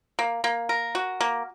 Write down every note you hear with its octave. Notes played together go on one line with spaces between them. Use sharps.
A#3
A#3
A#4
F#4
A#3